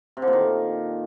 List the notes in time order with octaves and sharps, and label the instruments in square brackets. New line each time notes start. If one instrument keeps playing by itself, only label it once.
[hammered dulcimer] C3
D3
A#2
D#3